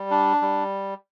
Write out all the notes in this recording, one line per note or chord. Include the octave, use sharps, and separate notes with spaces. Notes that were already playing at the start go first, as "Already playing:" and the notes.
Already playing: G3
D4
G3